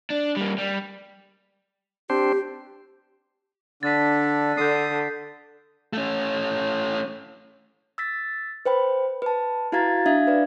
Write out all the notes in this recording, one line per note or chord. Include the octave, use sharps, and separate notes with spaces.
D4
G3 A#3
G3
C4 D4 G4 C5
D3 D4 A6 B6
D3 D#6 G6 C7
A3 C#4
E6 A6 B6
B4 C5 G5 B5
B4 A5
E4 F#4 F5 A#5 G#6 A6
D4 E5 F5 G#6
B4 D5